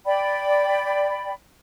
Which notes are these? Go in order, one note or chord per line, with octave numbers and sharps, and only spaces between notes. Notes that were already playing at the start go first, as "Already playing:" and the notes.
D5 G5 B5